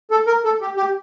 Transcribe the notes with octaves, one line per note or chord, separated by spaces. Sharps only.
A4
A#4
A4
G4
G4